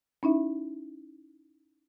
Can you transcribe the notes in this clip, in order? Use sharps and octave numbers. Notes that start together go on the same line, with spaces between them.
C#4 D#4 E4 E5